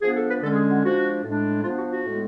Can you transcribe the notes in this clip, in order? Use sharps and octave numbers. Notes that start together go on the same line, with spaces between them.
F3 B3 D4 G#4
A4
B4
D3 G#3 C#4 A4
G#4
F#4
F3 G#3 D4 F#4
A2 G#3 D4
F3 B3 D4 F4
F#4
F#4
A2 G#3 B3